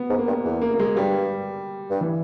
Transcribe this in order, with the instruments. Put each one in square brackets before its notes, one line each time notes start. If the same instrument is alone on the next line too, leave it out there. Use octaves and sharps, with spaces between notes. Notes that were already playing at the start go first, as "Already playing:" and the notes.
Already playing: [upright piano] B3
[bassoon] G#2
[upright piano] A#3
[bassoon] G2
E2
[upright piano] A#3
A#3
G#3
[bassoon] G2 [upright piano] G3
[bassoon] G2
[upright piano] E3